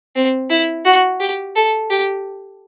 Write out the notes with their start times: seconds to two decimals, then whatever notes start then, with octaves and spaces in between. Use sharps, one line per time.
0.16 C4
0.50 E4
0.85 F#4
1.20 G4
1.56 A4
1.90 G4